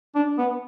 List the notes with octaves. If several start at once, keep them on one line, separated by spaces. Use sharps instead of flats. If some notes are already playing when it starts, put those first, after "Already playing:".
D4
B3